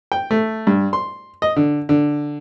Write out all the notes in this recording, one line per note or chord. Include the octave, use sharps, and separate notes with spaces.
G5
A3
G2
C6
D#5
D3
D3